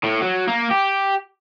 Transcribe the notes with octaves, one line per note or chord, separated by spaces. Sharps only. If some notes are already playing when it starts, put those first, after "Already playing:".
A2
F#3
A#3
G4